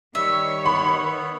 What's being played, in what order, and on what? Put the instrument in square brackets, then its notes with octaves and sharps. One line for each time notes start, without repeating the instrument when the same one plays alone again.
[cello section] D#3 C#5 [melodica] G3 [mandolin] E5
[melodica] B3 [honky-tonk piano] B5